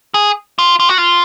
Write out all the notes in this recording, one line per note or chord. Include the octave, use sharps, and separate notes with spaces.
G#4
F4
F4
F#4
F4